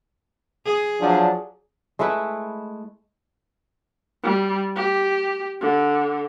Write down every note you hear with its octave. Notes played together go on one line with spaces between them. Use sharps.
G#4
F3 F#3 D4
G#3 A3 E4 B4
G3
G4
D3